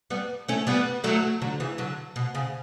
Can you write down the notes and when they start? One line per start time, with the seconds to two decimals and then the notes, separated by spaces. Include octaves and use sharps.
0.10 G3 B3
0.48 A3 C#4
0.67 G3 B3
1.04 F#3 A3
1.42 D3 F#3
1.60 C#3 E3
1.78 D3 F#3
2.16 B2
2.35 C#3